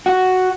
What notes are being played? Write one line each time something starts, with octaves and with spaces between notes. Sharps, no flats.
F#4